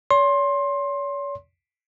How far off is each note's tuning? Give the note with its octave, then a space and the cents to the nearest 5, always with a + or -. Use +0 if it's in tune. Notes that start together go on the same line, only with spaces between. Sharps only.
C#5 +40 C6 +20